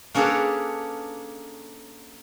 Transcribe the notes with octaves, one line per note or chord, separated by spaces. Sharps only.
A#3 C#4 D4 G#4 A4 B4